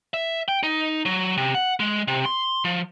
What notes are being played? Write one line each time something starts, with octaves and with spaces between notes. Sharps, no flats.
E5
G5
D#4
F#3
C3
F#5
G#3
C3
C6
F3